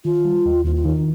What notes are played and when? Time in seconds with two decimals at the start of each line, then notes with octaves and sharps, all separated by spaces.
0.05 D#3 F4
0.25 G3
0.46 D#2
0.65 D#2 F4
0.75 F4
0.84 D#3 D#4